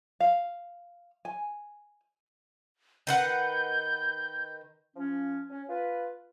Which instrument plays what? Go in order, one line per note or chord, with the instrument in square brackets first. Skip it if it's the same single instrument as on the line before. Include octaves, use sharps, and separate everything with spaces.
[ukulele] F5
G#5
[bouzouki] D#3 B4 F#5 [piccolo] G6
[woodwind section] F3 C#4
C#4
F4 B4